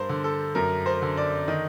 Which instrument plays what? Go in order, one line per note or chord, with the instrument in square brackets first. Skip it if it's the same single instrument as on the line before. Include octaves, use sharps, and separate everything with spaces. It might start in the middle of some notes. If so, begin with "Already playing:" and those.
Already playing: [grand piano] G2 A#4 C5
D3
A4
F#2 A#4
C5
D3
D5
D#3 D#5